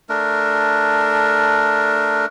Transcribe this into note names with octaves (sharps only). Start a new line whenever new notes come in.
A3 D4 A#4